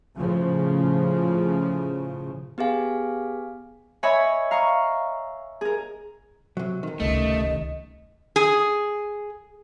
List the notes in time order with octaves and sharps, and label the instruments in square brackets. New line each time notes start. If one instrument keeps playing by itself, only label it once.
[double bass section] A2 C#3 F3
[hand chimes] B3 G4 G#4 F5 G#5
[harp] C#5 D#5 E5 G#5 B5
F5 A#5 C#6 D#6
G#4 A#4
[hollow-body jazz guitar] C3 F#3
C3 D#3
[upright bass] D#1 C#2 [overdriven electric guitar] A3 [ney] D#5
[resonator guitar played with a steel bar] G#4